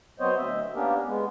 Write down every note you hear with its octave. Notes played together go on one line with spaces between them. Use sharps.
F#3 B3 C4 C5 C#5 D#5
D2 D#5 E5
A#3 B3 C#4 D4 G4 A#4
G#3 B3